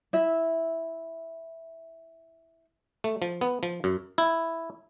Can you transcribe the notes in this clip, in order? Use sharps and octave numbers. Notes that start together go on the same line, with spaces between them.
E4 E5
A3
F3
B3
F3
F#2
E4